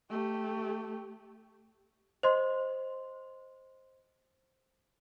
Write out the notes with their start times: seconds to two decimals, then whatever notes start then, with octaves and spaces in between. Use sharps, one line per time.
0.10 A3 G4
2.23 C5 D#5 C6